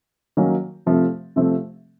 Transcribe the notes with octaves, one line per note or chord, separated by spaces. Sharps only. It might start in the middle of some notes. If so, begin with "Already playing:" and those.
D#3 F#3 A#3 C#4
C3 F3 A3 C4
C3 F3 A3 C4